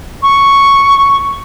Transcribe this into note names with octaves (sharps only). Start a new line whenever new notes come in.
C#6